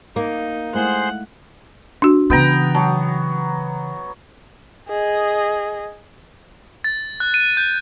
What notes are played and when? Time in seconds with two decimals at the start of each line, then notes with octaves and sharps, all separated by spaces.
0.16 A#3 D#4
0.75 G#3 A3 E4 G#4 C5 F#5 C6
2.02 D4 F#4
2.30 C#3 E3 B3 G5 A#5
2.75 F#3 A5
4.88 G#4 D#5
6.84 A6
7.20 F#6
7.34 D#7
7.57 G6